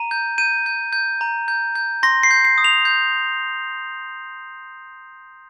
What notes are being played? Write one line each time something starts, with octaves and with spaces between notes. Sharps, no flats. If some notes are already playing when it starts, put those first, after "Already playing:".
Already playing: A#5 D#7
G6
G6 D#7
G6
G6
A#5
G6
G6
C6 A#6
C7
G6
C7
D#6
F7
G6